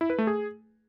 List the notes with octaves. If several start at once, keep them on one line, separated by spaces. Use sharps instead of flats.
E4
B4
A3
G#4